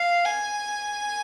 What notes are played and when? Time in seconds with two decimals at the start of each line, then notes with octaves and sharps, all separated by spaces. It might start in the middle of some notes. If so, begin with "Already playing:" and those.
Already playing: F5
0.25 G#5